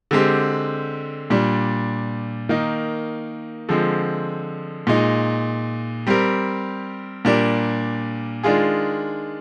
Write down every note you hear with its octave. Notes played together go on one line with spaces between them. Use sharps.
D3 G#3 C4 G4
A#2 G3 D4
D#3 A#3 D#4
D3 F3 G#3 C4
A#2 G#3 D#4
G3 C4 G4 A#4
A#2 G3 D4 G4 A#4
D#3 G#3 D4 F4 G#4